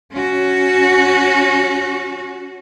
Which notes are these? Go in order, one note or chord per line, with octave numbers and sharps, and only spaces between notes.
C#4 F#4